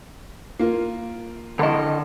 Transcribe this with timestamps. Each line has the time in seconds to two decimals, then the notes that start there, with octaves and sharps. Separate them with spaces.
0.59 A#3 F4
1.59 D3 D#5